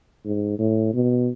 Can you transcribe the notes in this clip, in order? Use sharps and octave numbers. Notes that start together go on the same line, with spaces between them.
G#2
A2
B2